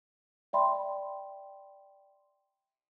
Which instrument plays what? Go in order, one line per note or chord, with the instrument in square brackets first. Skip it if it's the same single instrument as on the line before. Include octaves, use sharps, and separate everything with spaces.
[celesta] D5 E5 G5 B5 C6